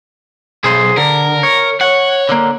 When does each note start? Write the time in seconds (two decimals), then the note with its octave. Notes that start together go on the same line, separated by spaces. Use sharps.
0.64 B1 G#4 C5
0.97 D3 A#4
1.43 C#5
1.81 C#5 F#5
2.29 D3 A#3